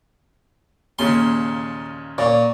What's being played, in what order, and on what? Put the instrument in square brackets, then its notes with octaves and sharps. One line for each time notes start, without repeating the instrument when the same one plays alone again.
[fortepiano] D#2 A#2 C#3 [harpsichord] C6
[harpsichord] A#2 [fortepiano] C#5 D5